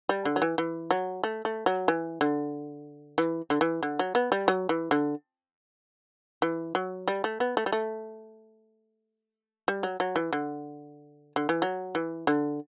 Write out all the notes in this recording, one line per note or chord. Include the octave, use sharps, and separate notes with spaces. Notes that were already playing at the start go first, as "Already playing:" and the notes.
G3
D3
F#3
E3
E3
F#3
A3
A3
F#3
E3
D3
E3
D3
E3
D3
F#3
B3
G3
F#3
E3
D3
E3
F#3
G3
A3
B3
A3
G3
A3
G3
F#3
F#3
E3
D3
D3
E3
F#3
E3
D3